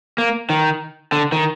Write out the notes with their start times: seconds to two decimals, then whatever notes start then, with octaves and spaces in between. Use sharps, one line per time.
0.18 A#3
0.50 D#3
1.12 D3
1.32 D#3